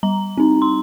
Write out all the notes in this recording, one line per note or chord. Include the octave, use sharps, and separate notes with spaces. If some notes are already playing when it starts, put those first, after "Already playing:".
G3 A#5
C4 D#4
C6